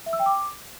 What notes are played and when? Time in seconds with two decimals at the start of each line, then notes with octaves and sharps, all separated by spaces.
0.06 E5
0.13 E6
0.19 G5
0.26 D6